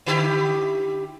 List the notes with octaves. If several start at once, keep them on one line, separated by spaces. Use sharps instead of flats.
D3 E4 G4